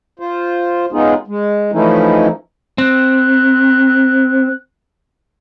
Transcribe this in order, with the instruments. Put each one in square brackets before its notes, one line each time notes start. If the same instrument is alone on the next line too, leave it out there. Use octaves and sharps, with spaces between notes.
[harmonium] F4 C5
G#3 B3 C#4 D#4 F4 G#4
G#3
E3 F3 A3 C#4 D#4 E4
[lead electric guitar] C4 [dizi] F#6